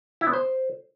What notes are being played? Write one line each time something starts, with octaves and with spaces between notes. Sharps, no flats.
E4
B3
C5